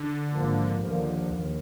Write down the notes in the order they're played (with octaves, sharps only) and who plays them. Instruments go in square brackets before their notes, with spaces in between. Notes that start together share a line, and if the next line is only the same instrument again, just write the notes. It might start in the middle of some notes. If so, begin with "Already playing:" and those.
Already playing: [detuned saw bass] D3
[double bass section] G#1 G#2 F3 A#3
D#2 D3 F3 A#3
D#2